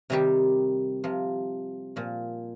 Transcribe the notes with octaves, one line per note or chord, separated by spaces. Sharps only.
C3 D#3 G3 G4
C3 F3
A#2 F3